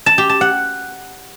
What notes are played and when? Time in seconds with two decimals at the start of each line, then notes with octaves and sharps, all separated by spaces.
0.06 A5
0.18 G4
0.29 A5
0.41 F#5